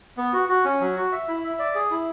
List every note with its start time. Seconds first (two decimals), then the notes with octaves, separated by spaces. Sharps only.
0.17 B3
0.33 F#4
0.49 F#4
0.65 C#4
0.80 F#3
0.97 F#4
1.12 E5
1.28 E4
1.44 E5
1.59 D5
1.75 G#4
1.91 E4